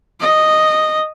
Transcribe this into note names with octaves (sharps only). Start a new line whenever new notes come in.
D#5